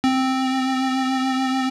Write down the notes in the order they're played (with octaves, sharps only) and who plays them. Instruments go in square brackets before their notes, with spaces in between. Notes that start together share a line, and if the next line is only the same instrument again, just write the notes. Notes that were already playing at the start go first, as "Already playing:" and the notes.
[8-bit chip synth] C4